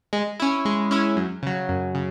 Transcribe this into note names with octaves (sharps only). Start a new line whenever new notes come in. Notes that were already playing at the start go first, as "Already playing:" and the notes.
G#3
C#4 E4
G#3
C#4 E4
F#2
C#3 F#3
F#2
C#3